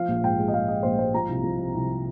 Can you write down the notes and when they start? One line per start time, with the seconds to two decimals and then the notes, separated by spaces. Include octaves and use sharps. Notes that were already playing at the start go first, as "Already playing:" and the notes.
Already playing: F3 F5
0.08 A#1
0.23 G#2 G5
0.38 G#3
0.48 D#5
0.53 G#3 F5
0.68 G#3 D#5
0.83 A#1 C5
0.99 G#3 C5
1.14 F3 A#5
1.29 C2
1.44 F3
1.59 C3
1.74 C2